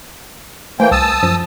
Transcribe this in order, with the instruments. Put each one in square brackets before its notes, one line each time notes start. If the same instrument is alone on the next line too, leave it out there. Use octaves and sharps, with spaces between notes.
[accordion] E3 A#3 G5 [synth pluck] A3 C5 G#5
[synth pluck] C2 [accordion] A5 D#6 E6
[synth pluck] F#2 F3 A#6